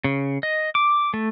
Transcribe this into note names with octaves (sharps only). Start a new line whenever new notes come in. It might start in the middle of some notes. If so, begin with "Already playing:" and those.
C#3
D#5
D6
A3